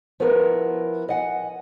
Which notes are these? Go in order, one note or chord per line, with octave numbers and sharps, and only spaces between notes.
F3 B3 E4 F#4 A#4
D#5 F#5 G#5